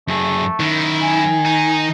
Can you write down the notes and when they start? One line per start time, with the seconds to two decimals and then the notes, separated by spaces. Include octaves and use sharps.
0.08 F#2 A3 G#4
0.60 F#2 D#3 E4
1.02 G#5
1.47 D#4